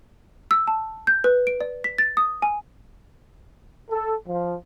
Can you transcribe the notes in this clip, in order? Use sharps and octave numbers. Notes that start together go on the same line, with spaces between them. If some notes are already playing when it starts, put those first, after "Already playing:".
E6
A5
G6
B4
D7
D5
B6
A6
D#6
G#5
A4
F3